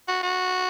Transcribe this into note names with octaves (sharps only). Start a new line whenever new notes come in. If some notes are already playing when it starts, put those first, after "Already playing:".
F#4
F#4